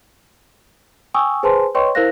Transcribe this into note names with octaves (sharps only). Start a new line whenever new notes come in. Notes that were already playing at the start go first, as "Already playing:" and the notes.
G5 G#5 C#6 D#6 E6
G#4 B4 C5 G#5 A5 C6
B4 C#5 D#5 G5 C6 C#6
E4 A#4 C5 F5 F#6 A#6